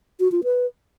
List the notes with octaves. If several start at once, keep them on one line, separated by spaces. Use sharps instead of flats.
F#4
F4
B4